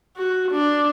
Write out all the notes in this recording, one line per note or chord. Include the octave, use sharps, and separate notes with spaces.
F#4
D4